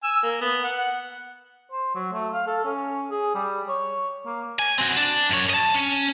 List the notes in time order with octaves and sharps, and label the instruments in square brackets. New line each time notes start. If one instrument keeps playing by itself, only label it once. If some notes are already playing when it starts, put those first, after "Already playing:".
[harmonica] G#5 E6
A#3
B3
F#5
[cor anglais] C5
F#3
A3
F5
A4
C#4
G#4
G3
C#5
A#3
[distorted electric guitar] G#5
C4 F#4
D4
F#2 C#5
D#5 A5
C#4